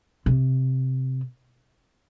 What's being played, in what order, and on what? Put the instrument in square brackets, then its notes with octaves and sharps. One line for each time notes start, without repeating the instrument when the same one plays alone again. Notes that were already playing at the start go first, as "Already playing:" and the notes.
[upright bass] C3